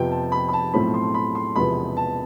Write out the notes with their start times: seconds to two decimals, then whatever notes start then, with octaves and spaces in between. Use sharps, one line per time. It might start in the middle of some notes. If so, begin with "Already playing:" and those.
Already playing: F2 C3 F3 B3 G5
0.11 A5
0.32 B5
0.49 B5
0.53 A5
0.73 B1 A2 F3 A3 C4 B5
0.94 C6
1.14 B5
1.35 C6
1.55 E1 E2 C3 F3 B3 B5
1.97 A5